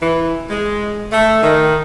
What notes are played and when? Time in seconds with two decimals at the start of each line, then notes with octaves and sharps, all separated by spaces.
0.02 E3
0.50 G#3
1.12 A3
1.43 D#3